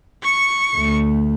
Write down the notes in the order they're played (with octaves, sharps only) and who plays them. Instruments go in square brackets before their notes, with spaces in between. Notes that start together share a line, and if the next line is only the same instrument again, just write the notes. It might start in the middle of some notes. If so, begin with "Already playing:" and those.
[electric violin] C#6 C#7
[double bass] D2 A3